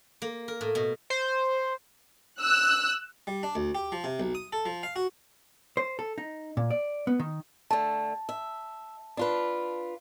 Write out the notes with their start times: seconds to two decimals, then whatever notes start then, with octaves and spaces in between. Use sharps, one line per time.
0.22 A#3
0.48 A#4
0.61 A2
0.75 B2
1.10 C5
2.42 E6 F#6
3.27 G3
3.43 D4
3.55 D2
3.75 G4
3.92 F3
4.04 C3
4.20 B1
4.35 D#6
4.53 A4
4.66 F3
4.83 F5
4.96 F#4
5.77 C5
5.99 A4
6.18 D#4
6.57 A#2
6.70 D5
7.07 B3
7.20 D#3
7.70 D3 A3 A5
8.29 E5
9.17 D4 F4 B4